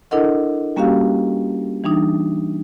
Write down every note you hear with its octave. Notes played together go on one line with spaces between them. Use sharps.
D4 E4 A4 A#4 D#5 F#5
G3 A#3 C#4 F#4 G4 F5
E3 G3 D4 D#4